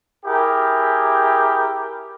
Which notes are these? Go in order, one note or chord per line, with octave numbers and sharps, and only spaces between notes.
E4 G4 G#4 A#4